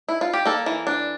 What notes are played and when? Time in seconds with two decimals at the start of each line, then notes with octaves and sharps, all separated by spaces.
0.09 E4
0.21 F4
0.33 G4
0.46 A#3 A4
0.66 E3
0.87 D4